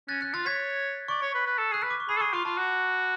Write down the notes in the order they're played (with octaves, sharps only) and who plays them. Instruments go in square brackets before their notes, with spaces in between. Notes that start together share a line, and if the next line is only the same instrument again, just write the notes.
[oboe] C#4 [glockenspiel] F#6 A6
[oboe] C#4 [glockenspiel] F#6 A6
[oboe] F4 [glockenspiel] F#6 A6
[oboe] C#5 [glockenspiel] G#6 B6
[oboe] D5 [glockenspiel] C#6
[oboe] C#5
B4
B4
A4
[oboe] G#4 [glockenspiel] F#6
[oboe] B4 [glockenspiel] F6
[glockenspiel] D6
C#6
[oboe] G#4 [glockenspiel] B5
[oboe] A4
[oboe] G#4 [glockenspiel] C#6
[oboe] F4 [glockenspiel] C#6
[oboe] F4 [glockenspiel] A5
[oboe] F#4